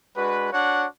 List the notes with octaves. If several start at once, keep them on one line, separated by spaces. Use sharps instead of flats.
G#3 D4 F#4 B4
D4 F#4 C#5 F#5